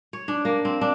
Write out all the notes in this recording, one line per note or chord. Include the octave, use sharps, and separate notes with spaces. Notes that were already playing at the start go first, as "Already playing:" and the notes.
C#5
D4
A#3
C4
D4